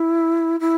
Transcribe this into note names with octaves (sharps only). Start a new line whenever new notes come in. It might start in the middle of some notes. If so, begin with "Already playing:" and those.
Already playing: E4
E4